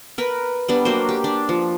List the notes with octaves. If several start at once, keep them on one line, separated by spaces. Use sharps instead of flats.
A#4 B4 B5
G3 B3 D4
F#3 A#3 F#4 C5
G4
D4
F3